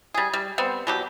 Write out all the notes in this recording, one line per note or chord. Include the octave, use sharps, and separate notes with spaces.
G3 G#4
G3
G3 B3 C4
B2 F#3 G4